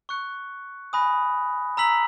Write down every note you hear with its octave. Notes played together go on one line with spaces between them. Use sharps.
C#6 F#6 C#7
G#5 B5 D#6 F#6 A#6
A#5 E6 B6 F#7